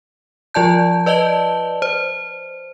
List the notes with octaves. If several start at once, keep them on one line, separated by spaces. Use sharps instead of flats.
F3 F4 D5 A5 G6
B4 D5 D#5 A5 G7
C5